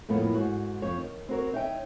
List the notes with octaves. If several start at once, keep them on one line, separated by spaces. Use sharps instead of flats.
F2 A2 A#3 B3
G#2 F#4
F2 C#5
D#3
C4 F#4 A#4 C#5
D#4 C#5 E5 F5 G5